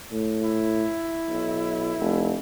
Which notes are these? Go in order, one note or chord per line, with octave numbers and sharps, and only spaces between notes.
A2
E4
B1
F1